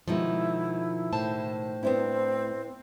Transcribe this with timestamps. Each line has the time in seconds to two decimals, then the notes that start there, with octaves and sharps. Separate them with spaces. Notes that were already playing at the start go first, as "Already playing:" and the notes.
0.08 B2 D#3 F3 G#3 E4
1.13 A2 C5 A5
1.83 B3 C4 D4 E4